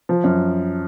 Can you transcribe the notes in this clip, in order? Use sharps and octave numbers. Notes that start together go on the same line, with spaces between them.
F3
F#2